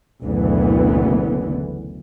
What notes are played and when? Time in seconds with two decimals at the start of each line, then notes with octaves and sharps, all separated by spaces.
0.24 F#1 D2 B2 D3 E3 B3